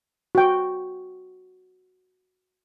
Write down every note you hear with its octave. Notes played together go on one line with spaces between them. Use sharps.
F#4 G5